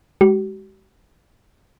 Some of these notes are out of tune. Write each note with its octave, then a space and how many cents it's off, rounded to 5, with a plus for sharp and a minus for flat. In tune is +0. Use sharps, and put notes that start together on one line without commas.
G#3 -10 G4 -45